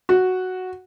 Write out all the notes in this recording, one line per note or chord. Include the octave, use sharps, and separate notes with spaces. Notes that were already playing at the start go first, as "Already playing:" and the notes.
F#4